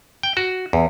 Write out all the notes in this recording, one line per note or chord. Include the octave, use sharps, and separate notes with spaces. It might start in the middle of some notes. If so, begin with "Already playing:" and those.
G5
F#4
E2